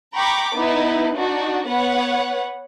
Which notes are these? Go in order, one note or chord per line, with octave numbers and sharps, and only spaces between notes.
G5 A#5 B5 C#6 D6
B3 D#4 E4 B4
D4 D#4 F#4
B3 B4 C#5 F#5